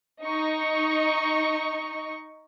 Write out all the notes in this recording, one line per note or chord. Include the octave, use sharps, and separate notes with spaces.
D#4 D#5 C#6